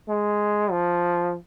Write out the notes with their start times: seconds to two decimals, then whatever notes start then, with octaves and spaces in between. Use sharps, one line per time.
0.09 G#3
0.71 F3